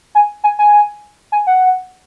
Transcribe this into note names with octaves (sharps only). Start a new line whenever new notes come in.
G#5
G#5
G#5
G#5
F#5